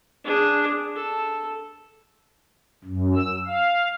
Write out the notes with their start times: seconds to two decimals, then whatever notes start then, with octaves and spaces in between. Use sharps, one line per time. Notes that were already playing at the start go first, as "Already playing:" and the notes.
0.24 D4 G#4
0.95 A4
2.84 F#2
3.15 E6
3.46 F5